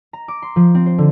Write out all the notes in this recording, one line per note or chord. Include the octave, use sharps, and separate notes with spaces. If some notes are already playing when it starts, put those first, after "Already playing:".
A#5
D6
C6
F3
C4
C5
D3